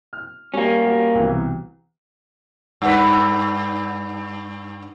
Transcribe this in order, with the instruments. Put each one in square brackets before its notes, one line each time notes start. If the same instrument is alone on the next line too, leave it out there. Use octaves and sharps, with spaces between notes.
[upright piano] F6
[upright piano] G3 [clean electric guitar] A#3 C#4
[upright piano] G3 F#4
C2 B2 E3
[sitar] G2 B4